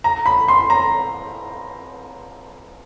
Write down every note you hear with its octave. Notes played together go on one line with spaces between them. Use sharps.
A#5
B5
C6
A#5